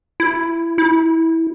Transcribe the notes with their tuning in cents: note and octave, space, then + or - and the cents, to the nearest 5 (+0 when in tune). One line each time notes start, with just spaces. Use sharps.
E4 +20
E4 -15